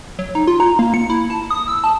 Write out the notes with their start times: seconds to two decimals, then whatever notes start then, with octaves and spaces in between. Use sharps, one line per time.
0.19 F#3
0.35 D#4
0.47 F4
0.60 A#5
0.79 A#3
0.94 C#7
1.10 E4
1.30 A5
1.50 D#6
1.68 E6
1.84 A5